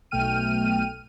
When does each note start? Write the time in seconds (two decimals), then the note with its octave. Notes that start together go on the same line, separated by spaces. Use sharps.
0.11 B1 B2 A3 G5 F6 D#7